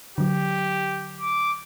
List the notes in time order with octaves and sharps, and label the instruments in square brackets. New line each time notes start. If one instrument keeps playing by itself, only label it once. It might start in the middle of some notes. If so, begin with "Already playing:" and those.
[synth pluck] D3 F#3 [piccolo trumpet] G4
[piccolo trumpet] D6